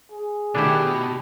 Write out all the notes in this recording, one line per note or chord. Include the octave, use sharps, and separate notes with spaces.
G#4
B2 D3 D#3 A3 D4 E4 G4